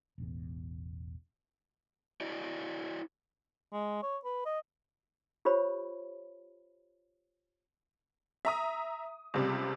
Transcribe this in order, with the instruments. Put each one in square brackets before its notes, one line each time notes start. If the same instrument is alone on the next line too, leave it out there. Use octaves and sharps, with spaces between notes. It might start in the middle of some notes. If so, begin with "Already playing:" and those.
[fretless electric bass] E1 A1 E2
[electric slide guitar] E4 F#4 D5 D#5
[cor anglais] G#3
C#5
B4
D#5
[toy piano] F4 G4 C5 C#5 B5
[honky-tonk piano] E5 A#5 D#6
C#2 C3 G3